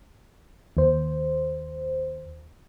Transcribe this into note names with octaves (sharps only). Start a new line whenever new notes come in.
D#2 C5